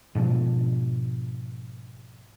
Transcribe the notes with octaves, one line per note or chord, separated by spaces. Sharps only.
G#2 B2 F3 D4